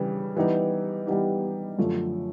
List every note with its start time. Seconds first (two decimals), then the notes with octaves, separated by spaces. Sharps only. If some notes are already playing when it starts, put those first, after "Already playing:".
Already playing: C#3 E3 G3
0.36 E3 G3 B3 D#4 G4
1.07 E3 G3 B3 D#4 G4
1.78 F#2 D3 F3 A3